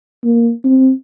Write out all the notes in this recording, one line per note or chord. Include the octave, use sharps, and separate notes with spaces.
A#3
C4